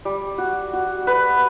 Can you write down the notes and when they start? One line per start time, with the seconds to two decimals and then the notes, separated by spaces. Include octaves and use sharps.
0.05 G3
0.38 F#4
0.73 F#4
1.07 B4